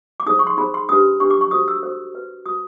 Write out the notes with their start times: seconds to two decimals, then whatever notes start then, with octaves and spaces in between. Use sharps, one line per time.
0.20 D6
0.26 D#4 G#4 C5 D#6
0.39 C#6
0.47 C6
0.58 D#4 G#4 C5 B5
0.74 C6
0.89 D4 G4 B4 D#6
1.20 D4 G4 B4 C#6
1.30 D6
1.41 C#6
1.51 F#4 A4 C5 D#6
1.68 E6
1.83 F#4 A4 C5
2.14 F#4 B4
2.46 F#4 B4 D#6